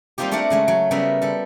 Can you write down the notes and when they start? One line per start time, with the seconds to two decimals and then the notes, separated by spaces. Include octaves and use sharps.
0.18 G3 A#3 C4 D#4 F4 G4
0.31 A3 D4 A#4 D5 F#5 A5
0.50 C#3 G#3 A3
0.68 F#3
0.91 C#3 G3 B3 A#4 E5
1.22 G3 A4